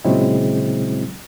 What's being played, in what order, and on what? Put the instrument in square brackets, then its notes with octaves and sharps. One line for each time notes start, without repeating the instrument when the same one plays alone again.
[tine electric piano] A#2 C#3 F#3 G#3 C4 E4